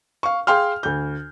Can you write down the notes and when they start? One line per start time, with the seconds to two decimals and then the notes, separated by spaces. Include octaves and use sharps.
0.23 F5 C#6
0.47 G#4 F5 G5 C6 F6
0.83 D2 G6